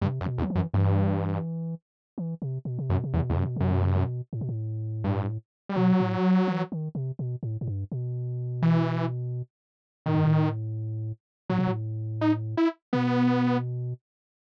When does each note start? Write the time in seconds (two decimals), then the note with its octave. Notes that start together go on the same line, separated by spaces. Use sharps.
0.02 G2 C3
0.21 F#2
0.26 B2
0.38 E2
0.42 F#3
0.50 E3
0.55 F#2
0.74 G2 E3
2.18 E3
2.42 C3
2.65 B2
2.79 C3
2.90 F#2 B2
3.04 C3
3.13 E2
3.17 B2
3.30 E2 C3
3.36 F#2
3.44 B2
3.56 F#2 C3
3.70 B2
3.83 C3
3.96 B2
4.33 A2
4.41 B2
4.49 A2
5.04 G2
5.69 G3
5.76 B2 F#3
6.00 A2
6.47 E3
6.72 D#3
6.95 C3
7.19 B2
7.43 A2
7.61 A2
7.67 G2
7.92 B2
8.62 E3
10.06 A2 D#3
10.15 G2
10.24 A2
11.50 A2 F#3
11.58 B2
11.67 A2
12.21 D#4
12.57 E4
12.93 B2 B3